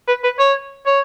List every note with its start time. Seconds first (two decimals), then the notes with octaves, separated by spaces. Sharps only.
0.08 B4
0.24 B4
0.39 C#5
0.87 C#5